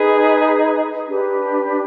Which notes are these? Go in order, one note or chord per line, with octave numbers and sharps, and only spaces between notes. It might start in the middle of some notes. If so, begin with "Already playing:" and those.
Already playing: D#4 G#4 B4
D4 G4 B4